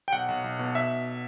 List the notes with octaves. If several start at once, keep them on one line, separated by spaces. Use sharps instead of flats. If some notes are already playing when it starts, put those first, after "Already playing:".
G5
B1 F#5
B1
B1
B2
E5